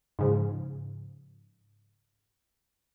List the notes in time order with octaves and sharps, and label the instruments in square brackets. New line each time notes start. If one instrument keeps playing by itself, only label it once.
[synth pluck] G#2 C#3 F3